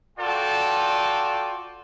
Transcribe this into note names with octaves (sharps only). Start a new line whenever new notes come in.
F4 F#4 A4 D5 G5